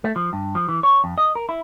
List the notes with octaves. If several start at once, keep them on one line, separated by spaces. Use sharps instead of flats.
A3
F3
G2
F3
E3
C#5
F2
D#5
A#4
E4